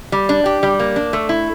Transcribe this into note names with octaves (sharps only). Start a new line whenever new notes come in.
G3
D4
G4
G3
A#3
D4
A3
E4